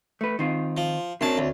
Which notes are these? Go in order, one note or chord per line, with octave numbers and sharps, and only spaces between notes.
A3 B4
D#3 C4 F4
F3
F#2 C4 D4 C#5 A5
D2